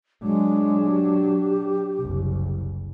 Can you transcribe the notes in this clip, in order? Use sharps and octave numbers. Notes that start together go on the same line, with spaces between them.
F#3 G#3 D4
G4
F#1 C2